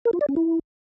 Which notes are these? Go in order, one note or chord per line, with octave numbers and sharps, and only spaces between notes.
A#4
F4
D5
C#4
E4